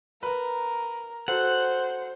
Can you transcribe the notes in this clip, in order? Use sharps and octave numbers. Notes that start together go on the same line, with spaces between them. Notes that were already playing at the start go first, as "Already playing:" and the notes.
A#4 B4 A#5
F#4 A4 C5 F#5